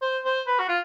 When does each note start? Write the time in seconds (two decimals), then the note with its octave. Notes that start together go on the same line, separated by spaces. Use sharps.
0.02 C5
0.25 C5
0.47 B4
0.59 F#4
0.69 F4